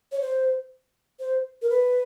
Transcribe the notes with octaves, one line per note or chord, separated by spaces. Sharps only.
C#5
C5
C5
A#4
B4